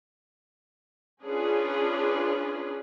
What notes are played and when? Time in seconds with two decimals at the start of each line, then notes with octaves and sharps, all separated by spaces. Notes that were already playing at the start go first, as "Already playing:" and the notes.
1.21 C#4 D4 F4 G#4 B4